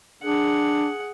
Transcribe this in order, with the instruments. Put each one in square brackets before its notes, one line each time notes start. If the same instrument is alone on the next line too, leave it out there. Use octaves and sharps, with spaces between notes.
[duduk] D4 [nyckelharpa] G#4 F#5